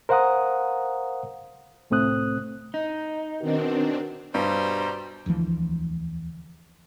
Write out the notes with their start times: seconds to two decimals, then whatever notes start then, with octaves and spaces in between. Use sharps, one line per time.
0.09 A#4 C5 F5 F#5 A#5 D#6
1.90 C2 A2 A3 C4 D#6 F#6
2.74 D#4
3.41 B2 D#3 C4 D4 F#4 A#4
4.34 G2 B2 G3 C5 A#5
5.26 E1 D2 E3 F3